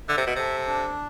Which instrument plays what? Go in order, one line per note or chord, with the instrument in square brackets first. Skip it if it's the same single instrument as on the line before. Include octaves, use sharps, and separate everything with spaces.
[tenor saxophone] D3 [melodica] E5
[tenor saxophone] C3
B2
[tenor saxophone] C3 [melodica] A4
[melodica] D4